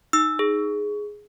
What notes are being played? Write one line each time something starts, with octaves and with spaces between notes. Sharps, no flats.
D#4 E6
G#4